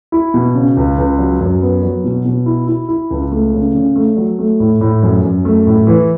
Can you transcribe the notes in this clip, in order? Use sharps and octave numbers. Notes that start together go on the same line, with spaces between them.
E4
B2
C#3
C#2
C#2
F#3
F#2
B3
F#3
B2
B2
E4
E4
E4
C#2
A3
C#3
C#3
A3
F#3
A3
A2
A2
F#2
F#2
A3
A2
E3